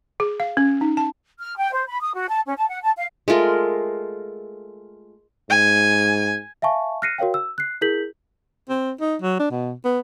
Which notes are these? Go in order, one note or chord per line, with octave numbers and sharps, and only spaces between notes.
G#4
F5
C#4
D#4
A5
F6
G5
C5
B5
D#6
F#4
A5
C#4
A5
F#5
A5
F5
G#3 A3 F4 A#4
G#2 G#5
E5 F5 G#5 A5 C#6
F6 F#6 A#6 C7 C#7 D#7
F#4 A#4 C#5 F5 G5
E6
F#6 C7
E4 G#4 A#4 G6 B6 F#7
C4
D#4
F#3
D4
B2
B3